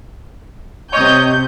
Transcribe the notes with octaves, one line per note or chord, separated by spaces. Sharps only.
C3 C#5 D#5 G6